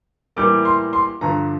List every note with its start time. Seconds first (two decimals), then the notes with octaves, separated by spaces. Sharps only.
0.36 A2 E3 G3 A#3 D6
0.65 C6
0.93 C6
1.21 G2 D3 F3 A#5